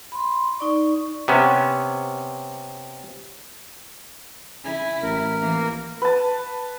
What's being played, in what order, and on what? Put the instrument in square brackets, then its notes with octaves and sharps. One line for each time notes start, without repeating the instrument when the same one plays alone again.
[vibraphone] B5 C6
D#4 D5 C#6
[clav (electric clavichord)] C3 B3 C#4
[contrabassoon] C#3 [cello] E4 [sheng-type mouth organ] G#5
[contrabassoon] A1 [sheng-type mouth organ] A#4
[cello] E3 A#3
[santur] B4 A5